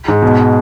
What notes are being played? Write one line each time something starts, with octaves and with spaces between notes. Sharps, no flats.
G#2
B2